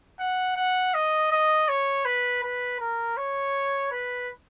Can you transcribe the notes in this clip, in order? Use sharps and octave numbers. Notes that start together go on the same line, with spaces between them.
F#5
F#5
D#5
D#5
C#5
B4
B4
A#4
C#5
B4